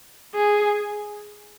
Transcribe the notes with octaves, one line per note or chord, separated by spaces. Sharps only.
G#4